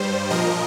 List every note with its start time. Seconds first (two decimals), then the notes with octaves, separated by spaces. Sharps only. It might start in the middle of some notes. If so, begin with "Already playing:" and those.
Already playing: G2 G3 C5
0.30 A#2 F3 A#4 D#5